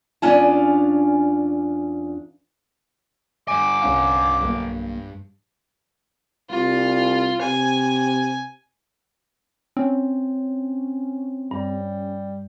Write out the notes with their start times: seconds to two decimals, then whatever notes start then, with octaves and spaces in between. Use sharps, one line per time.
0.22 E2 C#4 D4 F4 G#5 A5
3.48 G2 G#5 D6
3.82 C2 C#4 F5
4.42 B1 A#3
6.50 C2 F4
7.41 C3 G#5
9.77 C4 C#4
11.51 G2 G3